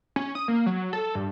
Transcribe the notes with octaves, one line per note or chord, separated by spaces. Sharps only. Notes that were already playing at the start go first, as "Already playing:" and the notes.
C#4
D#6
A#3
F#3
A4
G2